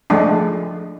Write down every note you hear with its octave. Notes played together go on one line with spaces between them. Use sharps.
F3 G#3 A3 D4